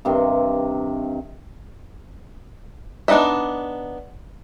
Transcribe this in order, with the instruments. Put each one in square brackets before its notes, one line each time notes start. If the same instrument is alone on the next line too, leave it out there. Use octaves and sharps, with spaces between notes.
[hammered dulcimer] G2 C3 D#3
[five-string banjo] B3 D4 D#4 D#5 E5